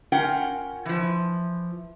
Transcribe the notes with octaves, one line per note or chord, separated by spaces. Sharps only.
C#4 F4 A#4 F#5 G5
E3 F3